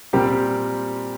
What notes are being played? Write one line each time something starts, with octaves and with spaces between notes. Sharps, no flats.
A#2 G3 C4 G4 A#4